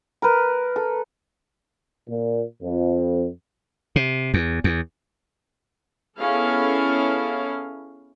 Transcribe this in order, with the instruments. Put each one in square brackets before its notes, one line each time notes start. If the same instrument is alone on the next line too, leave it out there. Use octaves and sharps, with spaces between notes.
[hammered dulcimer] A#4 B4
A4
[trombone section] A#2
F2
[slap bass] C3
E2
E2
[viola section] B3 C#4 E4 G#4 A4 F5